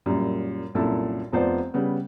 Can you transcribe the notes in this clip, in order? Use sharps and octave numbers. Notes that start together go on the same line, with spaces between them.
F#2 A#2 G3
C2 F#2 A#2 E4 A4
F1 F3 B3 C5 D5
C#3 G3 B3